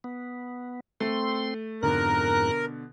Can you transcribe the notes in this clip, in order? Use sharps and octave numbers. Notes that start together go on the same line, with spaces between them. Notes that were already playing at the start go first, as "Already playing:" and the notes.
B3
A3 C4 C6
F2 G#2 B2 D3 A#4 F#6